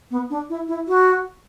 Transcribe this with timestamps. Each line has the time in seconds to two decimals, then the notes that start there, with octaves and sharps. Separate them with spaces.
0.11 B3
0.30 D4
0.49 E4
0.68 E4
0.88 F#4